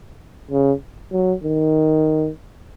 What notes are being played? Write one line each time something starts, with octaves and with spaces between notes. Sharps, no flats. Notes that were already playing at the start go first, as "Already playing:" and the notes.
C#3
F#3
D#3